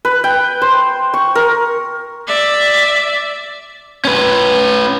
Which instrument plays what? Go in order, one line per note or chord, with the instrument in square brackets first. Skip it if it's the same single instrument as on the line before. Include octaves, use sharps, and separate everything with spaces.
[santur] B4
G5
C5
C#6
A#4
[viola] D5 E5
[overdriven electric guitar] C#4 B4